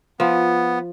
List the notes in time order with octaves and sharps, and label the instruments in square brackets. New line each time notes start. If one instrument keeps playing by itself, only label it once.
[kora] F3 [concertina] B3